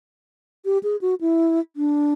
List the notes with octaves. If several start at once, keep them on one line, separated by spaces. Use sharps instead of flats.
G4
G#4
F#4
E4
D4